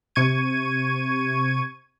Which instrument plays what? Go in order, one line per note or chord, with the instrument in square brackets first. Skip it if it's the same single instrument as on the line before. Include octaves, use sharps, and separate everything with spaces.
[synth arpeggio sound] C3 C#6 G#6 D#7